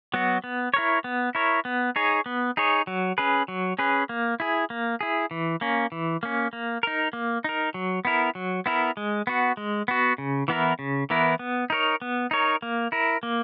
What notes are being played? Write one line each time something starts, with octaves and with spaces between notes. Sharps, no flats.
F#3 B3 F#4
B3
E4 A#4 C#5
B3
E4 A#4 C#5
B3
D#4 G#4 C#5
B3
D#4 G#4 C#5
F#3
C#4 G#4 B4
F#3
C#4 G#4 B4
A#3
E4 G#4
A#3
E4 G#4
E3
A#3 C#4
E3
A#3 C#4
A#3
D#4 A#4
A#3
D#4 A#4
F#3
B3 E4 A#4
F#3
B3 E4 A#4
G#3
B3 F#4
G#3
B3 F#4
C#3
E3 B3 E4 A#4
C#3
E3 B3 E4 A#4
B3
D#4 A#4 C#5
B3
D#4 A#4 C#5
A#3
E4 A#4
A#3